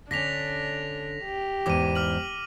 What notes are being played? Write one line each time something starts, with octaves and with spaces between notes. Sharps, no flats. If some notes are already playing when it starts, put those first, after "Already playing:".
D3 C#4 D4 A#6 B6 F7
G4
E2 G#2 E3 D6 D#7
D6 F6 F#7